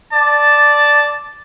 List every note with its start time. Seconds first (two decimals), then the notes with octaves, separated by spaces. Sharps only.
0.12 D5 A5